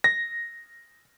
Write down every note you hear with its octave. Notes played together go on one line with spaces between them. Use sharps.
A#6